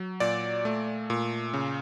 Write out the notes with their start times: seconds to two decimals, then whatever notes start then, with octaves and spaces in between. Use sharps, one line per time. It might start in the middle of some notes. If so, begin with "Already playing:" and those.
Already playing: F#3
0.20 A#2 D5
0.65 A3
1.10 A#2
1.54 C#3